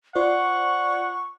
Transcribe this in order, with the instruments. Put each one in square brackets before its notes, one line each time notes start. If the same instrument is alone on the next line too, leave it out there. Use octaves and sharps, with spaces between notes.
[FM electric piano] F4 C5 D5 [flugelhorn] F#5 [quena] C#6